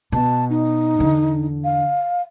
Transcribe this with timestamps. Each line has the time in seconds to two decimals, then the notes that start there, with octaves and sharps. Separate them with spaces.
0.12 B2 A5
0.49 D#4
0.99 E2 D3
1.64 F5